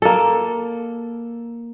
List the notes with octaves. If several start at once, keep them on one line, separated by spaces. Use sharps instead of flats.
A#3 A4